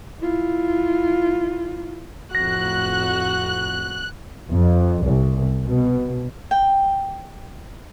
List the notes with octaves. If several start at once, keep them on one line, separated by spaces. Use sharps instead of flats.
E4 F4
F2 A2 F#4 F#6 A#6
F2
C2
B2
G5